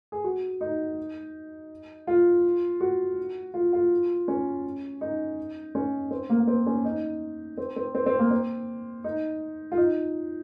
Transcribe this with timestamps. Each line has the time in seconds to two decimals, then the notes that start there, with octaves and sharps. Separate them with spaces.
0.12 G#4
0.24 F#4
0.61 D#4
2.07 F4
2.81 F#4
3.54 F4
3.73 F4
4.28 C#4
5.01 D#4
5.75 C#4
6.11 C4
6.30 A#3
6.40 A#3
6.47 C4
6.66 C#4
6.85 D#4
7.57 C4
7.76 C4
7.95 C4
8.06 C4
8.19 A#3
8.31 C4
9.04 D#4
9.72 F4
9.77 D#4